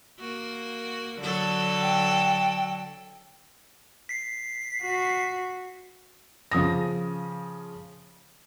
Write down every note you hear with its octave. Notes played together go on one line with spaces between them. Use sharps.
A#3 F#4
D3 F#3 A4
G5
B6 C7
F#4
C#3 F3 D#6 A#6